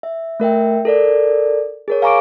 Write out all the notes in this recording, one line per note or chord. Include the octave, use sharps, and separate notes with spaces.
E5
A3 A#4 E5 G5
A4 A#4 D5
G#4 A#4 C#5
F5 G#5 A#5 C#6 D6 D7